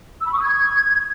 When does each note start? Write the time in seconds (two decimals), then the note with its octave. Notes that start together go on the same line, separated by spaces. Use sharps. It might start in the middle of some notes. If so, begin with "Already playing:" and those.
0.21 E6
0.26 B5
0.32 C#6
0.37 D#6
0.43 G#6